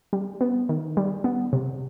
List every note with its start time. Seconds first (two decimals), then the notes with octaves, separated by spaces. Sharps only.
0.13 G3
0.41 B3
0.69 D#3
0.97 G3
1.24 B3
1.53 C3